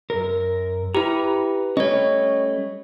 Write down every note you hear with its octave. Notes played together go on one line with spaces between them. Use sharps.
F#2 A#4
E4 G4 B4 A#5
G3 A3 C#4 C#5 D#5